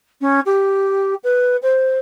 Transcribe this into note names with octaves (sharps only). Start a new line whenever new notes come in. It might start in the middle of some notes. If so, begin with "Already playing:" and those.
C#4
G4
B4
C5